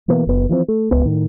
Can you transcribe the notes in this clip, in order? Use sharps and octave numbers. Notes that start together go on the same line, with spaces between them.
B2 E3 A#3 B3
F#1 B3
E3 F3 G#3 C4
A3
D1 C#2 B3
A2 D#3